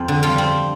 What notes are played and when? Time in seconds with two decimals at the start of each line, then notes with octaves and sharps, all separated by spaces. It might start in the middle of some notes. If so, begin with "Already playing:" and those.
Already playing: F2 C4
0.08 D3
0.23 G3 F4
0.38 C4